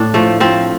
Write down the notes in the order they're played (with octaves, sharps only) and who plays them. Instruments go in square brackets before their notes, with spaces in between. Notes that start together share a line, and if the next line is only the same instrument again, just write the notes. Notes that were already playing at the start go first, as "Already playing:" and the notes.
Already playing: [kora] A2 D4
F3 A3
F3 C4